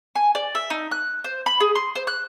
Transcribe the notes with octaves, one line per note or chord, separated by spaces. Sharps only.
G#5
D5
E5
D#4
F#6
C5
B5
G#4
C6
C5
F#6